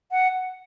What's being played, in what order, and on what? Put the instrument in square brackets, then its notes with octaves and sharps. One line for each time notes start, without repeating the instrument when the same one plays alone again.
[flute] F#5